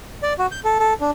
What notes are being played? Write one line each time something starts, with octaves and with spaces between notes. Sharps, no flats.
D5
F#4
G6
A4
A4
D4